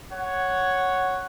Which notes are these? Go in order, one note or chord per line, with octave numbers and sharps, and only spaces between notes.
C#5 F#5